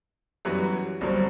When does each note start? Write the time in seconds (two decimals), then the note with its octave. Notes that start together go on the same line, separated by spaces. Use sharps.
0.45 F#2 E3 G3 B3 F#4
1.01 G1 G2 F#3 C4